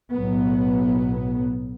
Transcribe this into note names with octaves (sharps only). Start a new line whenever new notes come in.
B1 A2 F#3 B3